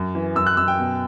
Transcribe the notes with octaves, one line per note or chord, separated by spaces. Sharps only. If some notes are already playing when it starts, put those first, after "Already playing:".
Already playing: F#2
E3
F#2 E6
F#6
F#2 E6
G5
B2